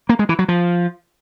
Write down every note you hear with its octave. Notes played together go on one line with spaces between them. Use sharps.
A#3
G#3
E3
F#3
F3